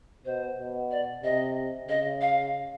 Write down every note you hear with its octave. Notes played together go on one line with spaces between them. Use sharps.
B2 C5
B2
D5
C3 D#5
C#3 D#5
F5